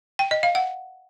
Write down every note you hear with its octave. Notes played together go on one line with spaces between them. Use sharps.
G5
D#5
F5
F#5